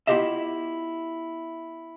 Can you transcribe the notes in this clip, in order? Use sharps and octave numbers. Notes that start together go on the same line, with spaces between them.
B3 E4 F4 G4 D#5 E5